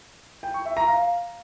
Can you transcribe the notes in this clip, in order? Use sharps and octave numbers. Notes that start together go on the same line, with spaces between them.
G5
C#6
E5
A#5
F5